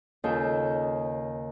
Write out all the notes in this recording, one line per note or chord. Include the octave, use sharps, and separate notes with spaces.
D#2 C#3 F4 A4 G6